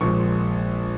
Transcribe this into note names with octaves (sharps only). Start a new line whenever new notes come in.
A#1 A#2 F3 G#3 C#6